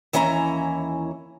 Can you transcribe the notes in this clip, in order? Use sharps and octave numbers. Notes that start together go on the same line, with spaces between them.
D#2 E3 C#4 E4 E5 A#5